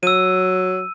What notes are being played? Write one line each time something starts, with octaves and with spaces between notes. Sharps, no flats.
F#3 E6 D#7